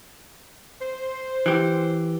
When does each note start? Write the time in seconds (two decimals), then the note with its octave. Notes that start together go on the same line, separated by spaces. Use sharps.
0.81 C5
1.46 E3 G4